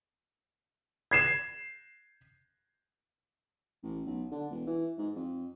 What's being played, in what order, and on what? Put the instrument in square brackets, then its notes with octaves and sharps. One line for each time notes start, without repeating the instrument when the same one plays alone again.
[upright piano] G#6 C7 E7
[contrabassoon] A1
B1
D3
E1
E3
G#2
F2